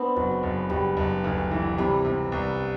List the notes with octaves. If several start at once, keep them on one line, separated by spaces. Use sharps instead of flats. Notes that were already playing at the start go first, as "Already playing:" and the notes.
Already playing: B3 C4 D4
F#1 F#3
F#1
F#1 G3
F#1
D2
E3
C3 G3
C3
C2